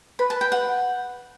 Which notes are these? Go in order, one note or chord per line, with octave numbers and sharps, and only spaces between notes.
B4 B5
A5
G5
F#5